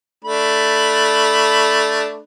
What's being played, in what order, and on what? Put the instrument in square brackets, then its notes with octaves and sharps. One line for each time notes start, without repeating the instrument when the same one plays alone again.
[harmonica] A3 D4 B5